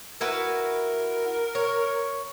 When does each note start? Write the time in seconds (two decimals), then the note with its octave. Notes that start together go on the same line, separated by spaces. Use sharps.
0.21 E4 F#4 A#4 B4
1.55 C#5